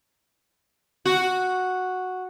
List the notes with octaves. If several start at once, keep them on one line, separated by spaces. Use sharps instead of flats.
F#4